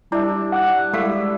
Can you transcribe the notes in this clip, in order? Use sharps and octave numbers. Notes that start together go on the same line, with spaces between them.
G3 D4 E4 E5
F#5 D6 F#6
G#3 E4 G4 A4 F5